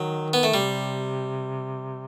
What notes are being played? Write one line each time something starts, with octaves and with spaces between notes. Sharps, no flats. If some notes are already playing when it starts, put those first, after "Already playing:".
Already playing: D#3 F#3
B3
A3
C3 G3